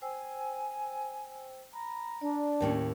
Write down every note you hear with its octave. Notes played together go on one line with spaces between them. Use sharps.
C5 G5 G#5 E6
A#5 B5
D4 D5
D#2 A2 C#4 G5